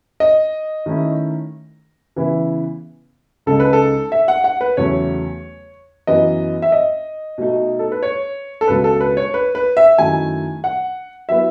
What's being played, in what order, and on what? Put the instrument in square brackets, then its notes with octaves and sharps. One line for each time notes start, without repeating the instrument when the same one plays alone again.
[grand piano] D#5
[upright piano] D#3 A3 C#4 E4
C#3 E3 B3 E4
[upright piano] C#2 C#3 G#3 D#4 [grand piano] A4
[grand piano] B4
A4
E5
F#5
F#5
B4
[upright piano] E2 C#3 F#3 A3 C#4 [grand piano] C#5
[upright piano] F#2 E3 B3 [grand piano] D#5
[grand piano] E5
D#5
[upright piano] B2 A3 D#4
[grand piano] A4
B4
C#5
A4
[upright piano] C#2 B2 G#3 [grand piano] B4
[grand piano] A4
B4
C#5
B4
B4
E5
[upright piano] F#2 D#3 A3 E4 [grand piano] G#5
[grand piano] F#5
[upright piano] F#3 B3 E4 [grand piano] E5